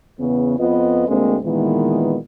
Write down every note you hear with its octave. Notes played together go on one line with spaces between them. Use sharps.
E2 C#3 B3
F2 B3 F4 B4 D#5
D2 G#3 A#3 C4
A#2 D#3 E3 G#3 B3